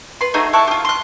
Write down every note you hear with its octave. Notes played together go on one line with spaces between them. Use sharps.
B4 C6
A3 D#4 F#4 G#4
E4 A4 C#6 F#6
F4 G4
C6 F#6